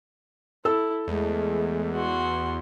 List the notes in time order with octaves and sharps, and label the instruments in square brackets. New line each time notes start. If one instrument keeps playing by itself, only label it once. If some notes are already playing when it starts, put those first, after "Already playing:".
[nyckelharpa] E4 [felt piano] A4 E6
[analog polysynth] E2 [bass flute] G#3 [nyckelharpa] A3
[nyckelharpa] F#4 C6